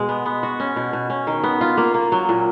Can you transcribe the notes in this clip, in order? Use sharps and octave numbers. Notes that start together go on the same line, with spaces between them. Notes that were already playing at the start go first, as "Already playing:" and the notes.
Already playing: B2 G#3
B3
B3
F#4
C#4
B2
B2
C#4
D#3
B3
F4
A#3
A#3
F#3
A#2